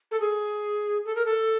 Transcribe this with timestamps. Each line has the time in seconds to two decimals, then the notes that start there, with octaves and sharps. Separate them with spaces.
0.11 A4
0.20 G#4
1.05 A4
1.15 A#4
1.25 A4